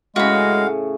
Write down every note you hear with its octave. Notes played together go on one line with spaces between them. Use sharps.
A2 C#3 G#3 F#4 F5 B5